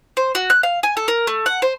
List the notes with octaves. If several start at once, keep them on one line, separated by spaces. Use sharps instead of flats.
C5
F#4
F#6
F5
G#5
A4
A#4
A3
F#5
C5